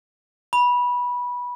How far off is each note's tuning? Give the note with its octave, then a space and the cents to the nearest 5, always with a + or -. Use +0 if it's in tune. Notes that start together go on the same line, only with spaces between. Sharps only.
B5 -15